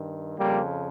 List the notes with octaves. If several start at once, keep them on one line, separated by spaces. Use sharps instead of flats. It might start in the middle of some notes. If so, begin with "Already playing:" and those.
Already playing: G2 D#3
F2 C#3 F3 G3 A#3